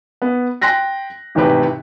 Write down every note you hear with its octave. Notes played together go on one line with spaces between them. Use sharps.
B3
G5 C6 F#6 A#6 B6
G#1 E2 A2 C3 G4 B4